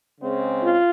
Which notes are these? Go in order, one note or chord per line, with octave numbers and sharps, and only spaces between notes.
C#3 G#3 C4
F4